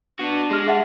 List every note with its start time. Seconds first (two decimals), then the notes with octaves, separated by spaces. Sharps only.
0.19 B3 D4 F#4
0.51 G#3 G4 F6
0.66 G#4 E5 F#5 A5